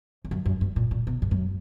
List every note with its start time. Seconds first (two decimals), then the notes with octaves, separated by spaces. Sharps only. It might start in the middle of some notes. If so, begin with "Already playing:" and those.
0.25 E2
0.31 F#2
0.46 F#2
0.61 G2
0.76 A#2
0.91 A#2
1.07 B2
1.22 G2
1.31 F#2